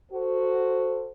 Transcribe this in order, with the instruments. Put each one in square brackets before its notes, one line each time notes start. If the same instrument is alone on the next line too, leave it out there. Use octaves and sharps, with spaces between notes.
[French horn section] F#4 A4 C5